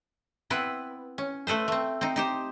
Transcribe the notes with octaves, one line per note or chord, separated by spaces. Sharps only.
B3 C4 E4 B4
C#4
A3 A4 B4 C5
A3 C4
C4 D#4
D#4 G4 C5